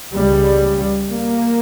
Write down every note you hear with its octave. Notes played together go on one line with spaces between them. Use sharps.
C#2 C#3 G3
A#3